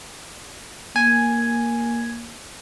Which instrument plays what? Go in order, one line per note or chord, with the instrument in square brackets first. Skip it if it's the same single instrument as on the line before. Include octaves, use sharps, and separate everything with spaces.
[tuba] A#3 [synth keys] G#5